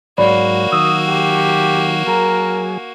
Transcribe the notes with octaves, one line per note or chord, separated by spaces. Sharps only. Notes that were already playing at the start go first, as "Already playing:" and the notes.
G#2 F#3 A#3 F#4 C#5 D5 B5
D#3 F#3 D#6 E6
G4
F#3 G#4 A#4 A#5